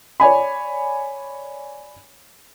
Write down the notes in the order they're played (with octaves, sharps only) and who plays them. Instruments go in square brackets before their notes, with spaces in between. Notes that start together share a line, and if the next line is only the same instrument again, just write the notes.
[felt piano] C#5 D5 G#5 B5